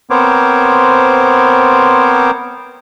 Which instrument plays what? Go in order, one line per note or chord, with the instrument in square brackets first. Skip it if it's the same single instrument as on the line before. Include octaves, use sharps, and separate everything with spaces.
[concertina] B3 C4 A#4 C5 C#5 D6